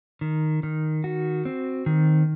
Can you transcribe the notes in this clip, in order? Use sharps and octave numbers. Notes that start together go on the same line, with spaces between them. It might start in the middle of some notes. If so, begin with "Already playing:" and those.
D#3
D#3
F#4
C4
D#3